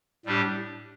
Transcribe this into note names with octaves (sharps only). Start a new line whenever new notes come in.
A2 G3 D4 G4